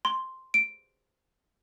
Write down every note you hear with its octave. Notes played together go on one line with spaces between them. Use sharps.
C6
D7